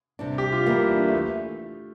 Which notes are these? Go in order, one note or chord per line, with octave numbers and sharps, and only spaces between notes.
C3 G3 D4
G4
F4
E2 E3 G3 A#3 E4
D4
A3